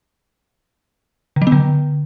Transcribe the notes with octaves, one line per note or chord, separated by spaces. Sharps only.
D3
F#3
B3
D3